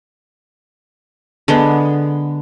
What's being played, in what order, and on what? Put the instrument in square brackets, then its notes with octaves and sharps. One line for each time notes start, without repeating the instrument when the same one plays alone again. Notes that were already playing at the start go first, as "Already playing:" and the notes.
[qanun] D3 G#3 B3